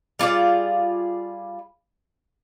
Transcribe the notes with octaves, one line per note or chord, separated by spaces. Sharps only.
G3 F4 G#4 D5